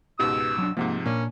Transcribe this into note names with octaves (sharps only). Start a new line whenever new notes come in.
C#2 G#2 B2 G4 B4 E6
F#3 D4
G#2 C3 F3 A#3 F#5
A#2 A#3 C#4 D4